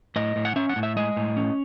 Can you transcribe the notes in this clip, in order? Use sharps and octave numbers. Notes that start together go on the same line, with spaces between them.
A2 D#5
A2
F#5
C#4 E5
F#5
A2
E5
G#3 D#5
A2
C#4